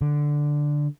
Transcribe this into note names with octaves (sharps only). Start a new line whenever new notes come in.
D3